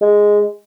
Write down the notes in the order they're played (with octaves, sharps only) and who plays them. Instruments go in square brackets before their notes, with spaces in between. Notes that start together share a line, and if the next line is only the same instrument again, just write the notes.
[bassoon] G#3